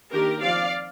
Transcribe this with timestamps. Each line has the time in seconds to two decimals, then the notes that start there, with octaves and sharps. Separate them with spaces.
0.12 D#3 A#3 D4 G4 A#4
0.42 F3 C4 D5 F5